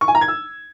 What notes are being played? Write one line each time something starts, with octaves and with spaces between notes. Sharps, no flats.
C#6
G#5
A#5
G#6
E6